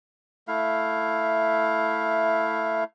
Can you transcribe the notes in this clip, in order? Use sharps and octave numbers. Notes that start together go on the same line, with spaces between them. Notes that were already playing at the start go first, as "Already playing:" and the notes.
A3 E4 F5